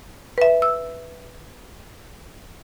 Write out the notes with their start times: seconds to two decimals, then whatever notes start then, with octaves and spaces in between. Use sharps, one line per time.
0.38 B4 E5
0.62 E6